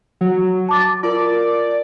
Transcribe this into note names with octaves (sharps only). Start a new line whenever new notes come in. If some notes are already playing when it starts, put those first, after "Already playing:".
F#3
A5 D6 A6
F4 A#4 D5